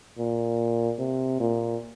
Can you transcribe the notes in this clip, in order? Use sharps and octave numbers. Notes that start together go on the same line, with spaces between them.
A#2
C3
A#2